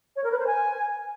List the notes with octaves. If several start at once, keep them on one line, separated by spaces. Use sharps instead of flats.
C#5
A#4
B4
C5
G#5